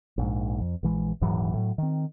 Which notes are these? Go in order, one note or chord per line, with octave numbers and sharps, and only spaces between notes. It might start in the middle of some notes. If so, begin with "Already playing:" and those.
A#1 G#2
F2
A#1 E3 G#3
D#1 G#2 E3 F#3
A2 F#3
D#3 C4